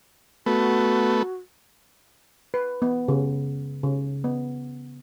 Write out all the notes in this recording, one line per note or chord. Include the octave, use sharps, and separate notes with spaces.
A3 B3 F#4
B4
B3
C#3
C#3
B3